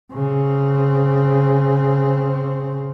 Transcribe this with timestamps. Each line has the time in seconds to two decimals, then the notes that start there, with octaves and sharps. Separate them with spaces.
0.13 C#3 C4